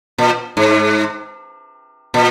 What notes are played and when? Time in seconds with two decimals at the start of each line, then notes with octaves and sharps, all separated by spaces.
0.18 A#2
0.57 G#2
2.14 A#2